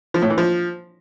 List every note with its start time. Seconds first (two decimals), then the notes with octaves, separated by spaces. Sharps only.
0.14 F3
0.22 A2
0.30 E3
0.38 F3